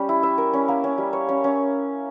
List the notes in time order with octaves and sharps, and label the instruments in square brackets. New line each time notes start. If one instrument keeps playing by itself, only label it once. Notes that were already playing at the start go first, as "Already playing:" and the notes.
Already playing: [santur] G3 C#4 G4
E4
E5
A#4
C#4
A#3
C#4
G3
C#5
C#4
C#4